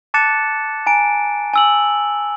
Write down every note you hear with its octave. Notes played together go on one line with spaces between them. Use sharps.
A5 D6 F#6 A6 C#7 E7
G#5 A#5 D7
G#5 E6 F#7